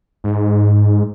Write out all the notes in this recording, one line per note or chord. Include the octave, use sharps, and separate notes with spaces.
G#2